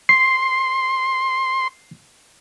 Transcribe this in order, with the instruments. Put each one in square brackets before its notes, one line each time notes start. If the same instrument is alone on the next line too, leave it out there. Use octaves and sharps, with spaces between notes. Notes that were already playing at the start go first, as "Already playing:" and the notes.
[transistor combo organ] C6 [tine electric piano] C7